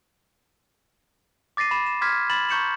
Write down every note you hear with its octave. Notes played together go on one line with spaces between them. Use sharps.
D6 A6 A#6 C7 D#7
B5 E7
E7
C6 D6 F6 G#6 B6
B5 A6 E7 F#7
A#5 C#6 G6 C#7 E7 F#7